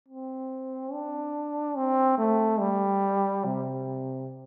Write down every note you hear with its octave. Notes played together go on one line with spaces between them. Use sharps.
C4
D4
C4
A3
G3
C3